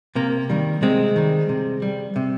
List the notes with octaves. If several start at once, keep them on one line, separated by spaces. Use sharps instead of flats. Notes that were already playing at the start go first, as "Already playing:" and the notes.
C3 A#3
D#3 G3
C3 G#3 C4
D#3 G3
C3
G3
C3